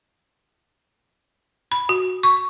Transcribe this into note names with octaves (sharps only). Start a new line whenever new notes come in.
B5
F#4
C#6